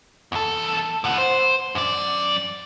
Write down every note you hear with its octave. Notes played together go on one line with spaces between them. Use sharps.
E2 A4
A2 F#5
C5
F#2 D5